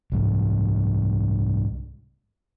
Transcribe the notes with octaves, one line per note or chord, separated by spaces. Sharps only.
C2 G#2